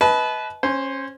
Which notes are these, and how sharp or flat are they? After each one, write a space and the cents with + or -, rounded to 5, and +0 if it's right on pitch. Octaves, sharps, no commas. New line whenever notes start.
B4 +0 D#5 +35 A5 -35
C#4 -20 C5 +0